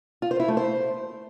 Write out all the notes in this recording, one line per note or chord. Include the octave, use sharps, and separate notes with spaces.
F4
C5
E4
A3
C5